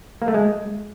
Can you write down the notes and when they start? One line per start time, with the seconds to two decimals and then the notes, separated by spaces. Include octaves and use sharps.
0.22 A#3
0.28 A3
0.34 G#3